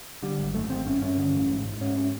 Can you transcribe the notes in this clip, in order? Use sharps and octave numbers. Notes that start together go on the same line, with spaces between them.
D3 G3
G#1
F#2 A3
G#1 C4
G2 C#4
G2 C#4
D3
A1
G#2
G#2
G#2 C#4
C#4